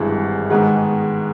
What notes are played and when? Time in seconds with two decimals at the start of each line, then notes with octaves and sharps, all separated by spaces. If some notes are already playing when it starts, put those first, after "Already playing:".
Already playing: G#1 G2 E3 G#3
0.50 G#2 D#3 G#3 B3